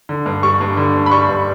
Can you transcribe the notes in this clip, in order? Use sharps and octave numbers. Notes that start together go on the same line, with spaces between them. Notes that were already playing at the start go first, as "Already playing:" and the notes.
D3
G2
G3 C#6
G2
D3
G2
B5
G3 C#6
G2